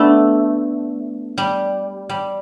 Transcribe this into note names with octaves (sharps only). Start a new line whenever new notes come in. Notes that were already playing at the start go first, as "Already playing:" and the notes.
Already playing: A3 B3 D4
G3
G3